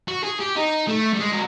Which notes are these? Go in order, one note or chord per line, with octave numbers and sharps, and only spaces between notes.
F#4
G#4
G4
D#4
A3
G3
G#3
F#3